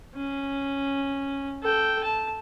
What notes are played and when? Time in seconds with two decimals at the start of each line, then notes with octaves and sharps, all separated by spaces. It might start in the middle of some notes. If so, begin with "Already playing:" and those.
0.15 C#4
1.62 A4 G5
2.04 A5